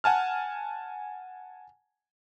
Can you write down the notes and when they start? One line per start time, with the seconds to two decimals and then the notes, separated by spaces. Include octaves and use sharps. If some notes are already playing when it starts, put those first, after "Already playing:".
0.04 F#5 G#5 A5 F6